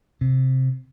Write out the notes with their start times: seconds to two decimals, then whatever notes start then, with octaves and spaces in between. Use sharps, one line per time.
0.21 C3